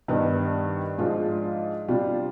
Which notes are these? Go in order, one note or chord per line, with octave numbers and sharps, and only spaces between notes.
G2 D#3 B3 D4
G#2 F3 G#3 D4 F4
C3 G3 D4 F4